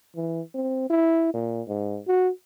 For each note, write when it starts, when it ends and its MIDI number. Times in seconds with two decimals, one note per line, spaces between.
0.16 0.41 52
0.54 0.88 60
0.90 1.33 64
1.34 1.62 46
1.67 1.99 44
2.07 2.30 66